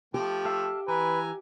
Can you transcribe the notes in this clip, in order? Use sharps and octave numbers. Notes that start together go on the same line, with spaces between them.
F3 A3 G4 G5
A4 E5 F5
E3 B4 G#5 A#5